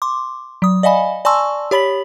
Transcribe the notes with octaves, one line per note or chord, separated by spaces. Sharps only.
C6 D6
F#3 D#6
D5 D#5 F5 G#5 B5
D5 G#5 A5 C6 C#6 E6
G4 C#5 B5 B6 F#7